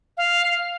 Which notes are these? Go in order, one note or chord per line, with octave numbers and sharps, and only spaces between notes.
F5